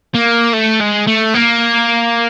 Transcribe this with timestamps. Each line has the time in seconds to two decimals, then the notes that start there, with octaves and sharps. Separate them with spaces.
0.14 A#3
0.54 A3
0.81 G#3
1.07 A3
1.34 A#3